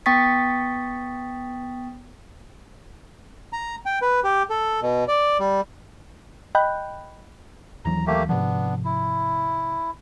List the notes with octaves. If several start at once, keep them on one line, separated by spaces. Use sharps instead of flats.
B3 G5 C#6 D#6 A6 B6
A#5
G5
B4
G4
A4
B2
D5
G3
D#5 G5 B5 F#6 G6
D#2 E3 F#3 A#5
A3 A#3 G4
G#2 C3 F3 B3 D4
E4